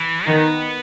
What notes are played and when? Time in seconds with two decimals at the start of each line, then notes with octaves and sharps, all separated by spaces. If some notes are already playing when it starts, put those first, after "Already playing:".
Already playing: E3
0.27 D#3 B3 D#4